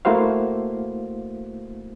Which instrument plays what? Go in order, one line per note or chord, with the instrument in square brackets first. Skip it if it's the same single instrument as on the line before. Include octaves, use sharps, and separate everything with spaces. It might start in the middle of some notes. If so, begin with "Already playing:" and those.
[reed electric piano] A3 A#3 E4 F#4 C5 F5